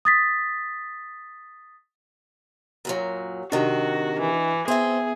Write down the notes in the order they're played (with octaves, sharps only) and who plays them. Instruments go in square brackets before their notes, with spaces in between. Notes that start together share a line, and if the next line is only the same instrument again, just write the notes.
[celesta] D#6 A6 B6
[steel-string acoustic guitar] F#2 A#2 F#3
[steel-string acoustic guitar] C3 D#3 [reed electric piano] D4 D#5 [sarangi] F#4
[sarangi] E3
[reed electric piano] B3 E5 [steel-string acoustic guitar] C4 C5 [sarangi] G#4